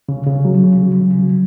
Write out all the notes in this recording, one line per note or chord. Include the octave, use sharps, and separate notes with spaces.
C#3
C#3
F#3
C#3
F#3
C#3
F#3